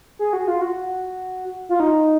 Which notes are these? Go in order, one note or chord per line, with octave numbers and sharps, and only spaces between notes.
G#4
F#4
F4
F#4
F4
D#4